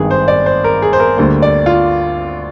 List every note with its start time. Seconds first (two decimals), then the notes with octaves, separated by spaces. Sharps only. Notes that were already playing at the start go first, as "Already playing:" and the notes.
Already playing: G#1 G2 D#3 G#4
0.11 C5
0.28 D5
0.46 C5
0.64 A#4
0.82 G#4
0.93 C5
1.00 A#4
1.17 D2 D3 G3 A#3 C5
1.42 D5
1.66 F4